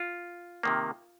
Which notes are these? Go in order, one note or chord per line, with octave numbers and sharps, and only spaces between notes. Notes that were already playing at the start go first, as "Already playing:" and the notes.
Already playing: F4
C3 D#3 A#3